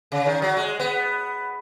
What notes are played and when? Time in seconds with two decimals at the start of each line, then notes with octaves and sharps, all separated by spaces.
0.12 C#3
0.26 D#3
0.42 F#3
0.57 G#3
0.80 B3